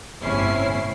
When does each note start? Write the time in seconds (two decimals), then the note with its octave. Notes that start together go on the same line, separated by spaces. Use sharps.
0.21 G1 A2 C3 C#4 E4 C7